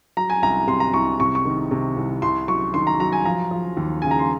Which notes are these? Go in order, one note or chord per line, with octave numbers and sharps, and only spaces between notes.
F#3 A#5
G#5
C2 A#5
C3 C6
A#5
C2 C#6
C3 C#6
C#6
D#3
C3
C2
C2 C6
F#3 C#6
D#3 C6
A#5
F#3 A#5
G#5
F3 A#5
F3
D#2
C#3 G#5
A#5
C6